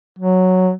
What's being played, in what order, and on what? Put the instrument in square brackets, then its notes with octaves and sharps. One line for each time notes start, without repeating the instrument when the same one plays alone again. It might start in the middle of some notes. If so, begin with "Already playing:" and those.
[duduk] F#3